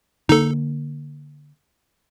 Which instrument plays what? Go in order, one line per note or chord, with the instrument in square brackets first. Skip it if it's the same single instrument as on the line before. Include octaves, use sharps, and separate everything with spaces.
[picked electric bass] D3 A#3 [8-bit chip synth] D#4 A4